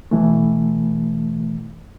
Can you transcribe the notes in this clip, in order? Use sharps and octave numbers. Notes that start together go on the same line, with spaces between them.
B2 E3 A3